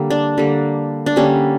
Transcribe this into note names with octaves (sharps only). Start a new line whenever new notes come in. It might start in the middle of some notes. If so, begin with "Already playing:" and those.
Already playing: D3 G3 A#3
D4
D3 G3 A#3
D4
D3 G3 A#3 C#4